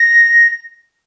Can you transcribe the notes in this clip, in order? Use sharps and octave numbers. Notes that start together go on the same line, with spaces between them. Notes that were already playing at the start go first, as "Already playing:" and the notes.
Already playing: A#6